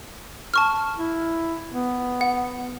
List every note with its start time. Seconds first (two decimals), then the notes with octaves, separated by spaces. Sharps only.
0.54 A5 C#6 F6
0.97 E4
1.71 B3
2.21 F#5